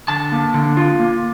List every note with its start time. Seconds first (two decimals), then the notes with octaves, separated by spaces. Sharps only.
0.08 D3 A5
0.32 A#3
0.54 D3
0.77 F4
1.00 A#3